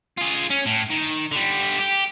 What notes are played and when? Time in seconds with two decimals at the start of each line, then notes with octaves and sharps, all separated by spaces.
0.18 F4 G#4
0.50 C#4
0.66 A2
0.90 D#3
1.31 D3 G3
1.79 G4